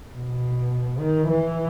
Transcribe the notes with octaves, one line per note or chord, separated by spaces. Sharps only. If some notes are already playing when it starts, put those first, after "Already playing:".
B2
D#3
E3